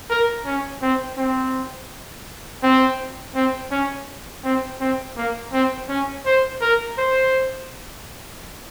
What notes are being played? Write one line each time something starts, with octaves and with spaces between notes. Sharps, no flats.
A#4
C#4
C4
C4
C4
C4
C#4
C4
C4
A#3
C4
C#4
C5
A#4
C5